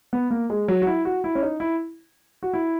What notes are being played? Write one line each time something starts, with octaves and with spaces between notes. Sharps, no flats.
B3
A#3
G#3
F#3
F#4
E4
F#4
E4
C#4
D#4
E4
F#4
E4